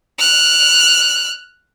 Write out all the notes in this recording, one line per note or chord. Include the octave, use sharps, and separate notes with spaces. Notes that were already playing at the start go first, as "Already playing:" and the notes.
F6 F#6